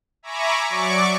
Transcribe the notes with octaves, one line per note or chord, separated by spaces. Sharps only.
E5 G#5 A#5 B5 C#6 D6
F#3 D5 C#6 D6